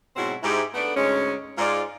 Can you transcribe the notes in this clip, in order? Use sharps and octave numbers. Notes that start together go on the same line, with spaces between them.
G#2 B2 F#3 C4 E4 F#4
G#2 E4 G4
A3 B3 D4
D2 G#2 G#3 C#4
G#2 F4 D5